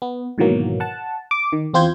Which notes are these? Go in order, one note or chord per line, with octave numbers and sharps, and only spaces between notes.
B3
G#2 B2 D#3 E3 F#3 A#3
F#5 A5
D6
D#3
E2 C4 F4 C5 G6 G#6